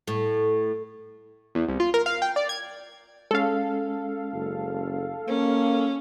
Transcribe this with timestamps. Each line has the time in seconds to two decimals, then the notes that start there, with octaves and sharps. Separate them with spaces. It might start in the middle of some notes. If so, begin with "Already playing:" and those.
0.07 A2
1.55 E2
1.69 C2
1.80 F4
1.94 A#4
2.06 F5
2.22 G5
2.36 D5
2.49 G#6
3.31 G#3 C#4 A4 F5
4.33 F#1
5.28 A#3 C#4